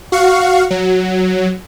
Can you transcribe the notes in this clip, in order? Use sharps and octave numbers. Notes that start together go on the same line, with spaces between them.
F#4 F5 C#6
F#3